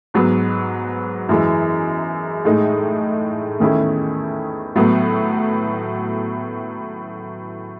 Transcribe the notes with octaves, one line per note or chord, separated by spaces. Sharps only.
G#2 F#3 B3
F#2 E3 G#3
A2 G#3 D#4
E2 D#3 A3 C#4 E4
A2 F#3 B3